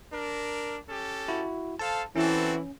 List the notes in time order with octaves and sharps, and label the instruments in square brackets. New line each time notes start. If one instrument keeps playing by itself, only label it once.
[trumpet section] D4 A#4
C#4 G4 A4
[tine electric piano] E4 F#4
[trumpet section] A4 C5 F5 [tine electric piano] A5
[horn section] E3 [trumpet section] C4 F#4 A4 [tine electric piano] C#4